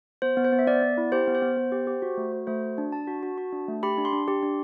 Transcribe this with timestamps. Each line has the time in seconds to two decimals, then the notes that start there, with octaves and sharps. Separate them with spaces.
0.22 B3 C5
0.37 B3
0.45 C5
0.52 B3
0.59 E5
0.67 B3 D5
0.82 B3
0.97 E4
1.12 G4 C5
1.27 B3
1.35 C5
1.42 B3
1.57 B3
1.72 G4
1.87 G4
2.02 F#4
2.17 A3
2.32 F#4
2.47 A3 C5
2.63 F#4
2.78 D4
2.92 D4 A5
3.07 F#4
3.23 F#4
3.38 F#4
3.52 D4
3.68 A3
3.83 G4 B5
3.98 D4
4.05 C6
4.13 D4
4.28 G4
4.43 D4